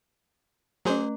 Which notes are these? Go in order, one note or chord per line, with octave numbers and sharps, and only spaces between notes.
F#3 A3 C#4 G#4 C5